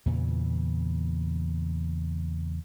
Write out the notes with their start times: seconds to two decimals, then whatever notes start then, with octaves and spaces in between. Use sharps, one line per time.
0.06 E2 A#2 C#3 E3